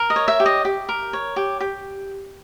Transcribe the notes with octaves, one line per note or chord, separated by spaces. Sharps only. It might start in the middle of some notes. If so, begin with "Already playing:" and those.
Already playing: A#4
D#5
C#5
E5
G4
D#5
G4
A#4
C#5
G4
G4